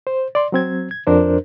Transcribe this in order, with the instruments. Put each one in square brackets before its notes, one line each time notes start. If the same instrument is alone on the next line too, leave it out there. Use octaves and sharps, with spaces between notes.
[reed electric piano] C5
D5 C6
F#3 C4 G#6
G#6
F2 D4 A#4 C5